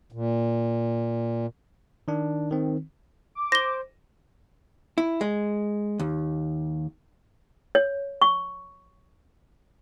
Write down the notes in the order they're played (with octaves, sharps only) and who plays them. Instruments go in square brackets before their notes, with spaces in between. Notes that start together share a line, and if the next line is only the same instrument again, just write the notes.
[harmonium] A#2
[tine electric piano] D#3 D4
D#3 C4
[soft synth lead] D6
[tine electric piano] C5 [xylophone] A#6 G7
[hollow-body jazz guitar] E4
G#3
D#2
[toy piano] C#5
C#6